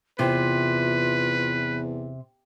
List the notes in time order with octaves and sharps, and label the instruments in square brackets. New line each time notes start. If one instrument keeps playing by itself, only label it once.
[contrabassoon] E2 [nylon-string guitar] C3 [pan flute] F4 [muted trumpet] B4